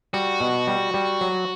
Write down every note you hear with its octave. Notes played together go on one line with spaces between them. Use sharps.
G3 F#4
B2
G3
G3
F#3